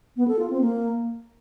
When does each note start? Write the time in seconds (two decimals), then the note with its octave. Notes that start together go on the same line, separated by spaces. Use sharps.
0.17 B3
0.28 A4
0.39 F4
0.50 C4
0.61 A#3